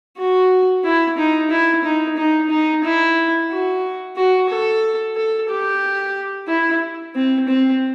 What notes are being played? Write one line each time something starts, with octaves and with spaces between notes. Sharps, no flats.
F#4
E4
D#4
E4
D#4
D#4
D#4
E4
F#4
F#4
A4
A4
G4
E4
C4
C4